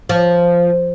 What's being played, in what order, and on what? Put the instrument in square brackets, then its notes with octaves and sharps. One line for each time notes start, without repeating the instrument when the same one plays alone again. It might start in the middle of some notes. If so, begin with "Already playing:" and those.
[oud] F3